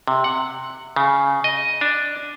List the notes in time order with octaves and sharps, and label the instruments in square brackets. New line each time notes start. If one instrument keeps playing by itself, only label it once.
[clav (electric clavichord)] C3
F#5
C#3
D#5
D4